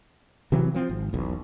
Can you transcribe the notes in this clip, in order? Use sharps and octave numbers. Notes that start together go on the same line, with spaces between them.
C3 E3 F#3 C4
F3 C4
G#1
E1 B1